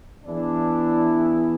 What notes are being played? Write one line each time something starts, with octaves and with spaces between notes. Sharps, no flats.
E3 B3 D4 E4 G#4